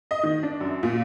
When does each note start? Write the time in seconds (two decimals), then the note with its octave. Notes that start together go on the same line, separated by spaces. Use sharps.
0.11 D#5
0.23 D#3
0.43 D4
0.60 F#2
0.83 A#2